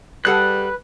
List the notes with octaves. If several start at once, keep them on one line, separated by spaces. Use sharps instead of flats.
G3 G#4 A4 B4 F#5 F#6